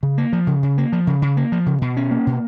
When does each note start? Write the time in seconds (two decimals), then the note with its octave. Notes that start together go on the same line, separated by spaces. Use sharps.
0.03 C#3
0.18 A#3
0.33 F3
0.47 C#3
0.63 C#3
0.78 A#3
0.92 F3
1.07 C#3
1.22 C#3
1.37 A#3
1.52 F3
1.66 C#3
1.82 B2
1.97 C#4
2.11 A#3
2.27 B2